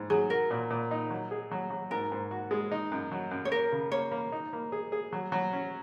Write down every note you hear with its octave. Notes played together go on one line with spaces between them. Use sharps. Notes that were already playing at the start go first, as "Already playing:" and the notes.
Already playing: G#2
F#3 G#4
F#4 A#4
A#2
A#2
D#4
F#3
G#4
F#3
F#3
G#2 A#4
G#2
F#4
G#3
D#4
F#2
F#3
F#2
C#5
A#3 A#4
C#3
A#3 C#5
A#3
D#4
A#3
G#4
G#4
F#3
F#3
C#4